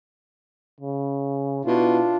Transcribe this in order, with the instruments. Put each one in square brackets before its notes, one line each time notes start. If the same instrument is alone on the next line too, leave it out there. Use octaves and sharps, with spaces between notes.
[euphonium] C#3
[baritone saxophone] B2 [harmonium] D4 F4 [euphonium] E4